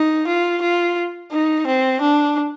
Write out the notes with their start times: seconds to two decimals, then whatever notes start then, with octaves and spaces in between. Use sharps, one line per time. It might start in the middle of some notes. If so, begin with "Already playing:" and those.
Already playing: D#4
0.27 F4
0.62 F4
1.32 D#4
1.67 C4
2.01 D4